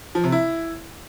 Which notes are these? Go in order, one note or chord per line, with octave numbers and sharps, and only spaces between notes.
F3
C3
E4